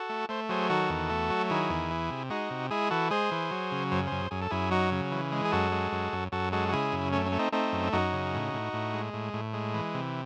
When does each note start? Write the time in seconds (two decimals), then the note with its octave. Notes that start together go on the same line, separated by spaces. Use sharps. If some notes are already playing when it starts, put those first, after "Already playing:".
Already playing: F#4 A4
0.09 A3
0.29 A3 C5
0.49 F#3 G#4 C5
0.70 D#3 F#4 A4
0.89 E2
1.10 A3
1.30 F#3
1.50 D#3 E4 G#4
1.70 E2
1.90 E3
2.10 C3
2.30 G#3 D#4 F#4
2.50 C3
2.70 G#3 E4 G#4
2.90 E3 F#4 A4
3.11 G#3 G#4 C5
3.32 E3
3.51 F#3
3.72 C#3
3.91 F#2 C5
4.07 F#2 G#4 C5
4.31 F#2 G#4
4.42 A4
4.51 F#2 E4 G#4
4.71 F#3 D#4 F#4
4.92 C#3
5.11 E3
5.32 G#3
5.45 G#4
5.52 F#2 F#4 A4
5.72 G#3
5.92 F#2
6.12 F#2
6.32 F#2 F#4 A4
6.53 G#3 F#4 A4
6.69 F#4
6.73 C#3 E4 G#4
6.92 F#2
7.13 A3 C#4
7.26 C#4
7.32 A3
7.39 C4 D#4
7.52 A3 C4 D#4
7.73 F#2
7.92 F#2 D#4 F#4
8.13 C#3
8.34 A2
8.53 A2
8.73 A2
8.94 G#3
9.13 A2
9.33 A2
9.54 G#3
9.74 E3
9.94 C3